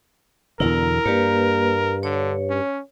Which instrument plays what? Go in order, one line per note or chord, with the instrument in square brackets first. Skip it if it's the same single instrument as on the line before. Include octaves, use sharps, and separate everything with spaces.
[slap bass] E2 B2 D3 [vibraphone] E4 A#5 [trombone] A#4
[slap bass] G2 [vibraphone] A#3 G4 B4
[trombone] D3 [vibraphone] C#5
[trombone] C#4